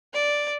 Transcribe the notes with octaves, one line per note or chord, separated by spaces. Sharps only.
D5